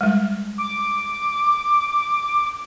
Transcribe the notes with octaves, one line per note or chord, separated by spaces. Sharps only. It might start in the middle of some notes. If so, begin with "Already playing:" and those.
G3 G#3
D6